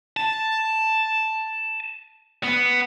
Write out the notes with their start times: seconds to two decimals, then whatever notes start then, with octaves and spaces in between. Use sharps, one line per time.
0.17 A5
2.43 B3